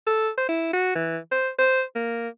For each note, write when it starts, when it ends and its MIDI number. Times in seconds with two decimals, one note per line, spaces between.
0.07 0.29 69
0.37 0.46 72
0.49 0.72 64
0.73 0.95 66
0.95 1.17 52
1.32 1.49 72
1.58 1.83 72
1.95 2.28 58